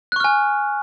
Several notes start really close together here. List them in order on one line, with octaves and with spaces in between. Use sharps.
F#6 C#6 F6 G#5